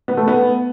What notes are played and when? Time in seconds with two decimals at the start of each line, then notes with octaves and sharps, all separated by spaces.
0.08 B3
0.17 A3
0.28 B3